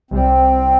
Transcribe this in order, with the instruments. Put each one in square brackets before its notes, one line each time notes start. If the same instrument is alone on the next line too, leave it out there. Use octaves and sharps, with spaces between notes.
[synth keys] C2 C3 G3 [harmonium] C4